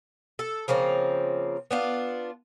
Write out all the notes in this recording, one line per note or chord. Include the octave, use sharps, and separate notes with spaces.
A4
C#3 F3 A#3 C4
B3 D4 F4